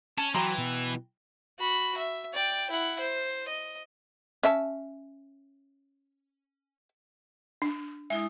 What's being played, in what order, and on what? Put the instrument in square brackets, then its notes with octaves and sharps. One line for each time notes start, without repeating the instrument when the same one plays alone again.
[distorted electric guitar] C#4 [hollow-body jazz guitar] A5
[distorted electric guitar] E3 [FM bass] F#3 [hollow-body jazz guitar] G5 A#5 C6
[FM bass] B2
[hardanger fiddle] F#4 B5
E5
D5 G5
E4 F#5
C5
D#5
[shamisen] C#4 E5 A5
[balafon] D4
[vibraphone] G#3 E4 D#6 [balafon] E5